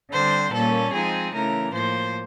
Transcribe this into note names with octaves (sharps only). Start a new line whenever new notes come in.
D3 G3 C4 C5
A#2 G3 A#3 C#4 A4
F3 G#3 C4 D#4 G#4
C#3 E3 A3 A#4
A2 F3 A#3 C5